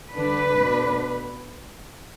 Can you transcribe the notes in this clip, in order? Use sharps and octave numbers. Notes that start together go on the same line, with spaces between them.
D3 G3 D4 B4
B2 A3 D4